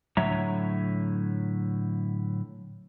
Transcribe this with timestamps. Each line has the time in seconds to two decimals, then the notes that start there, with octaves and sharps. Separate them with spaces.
0.17 A2 D3 F#3 C#5 E5 A#5